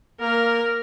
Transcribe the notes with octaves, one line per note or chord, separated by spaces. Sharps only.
A#3 A#4 F6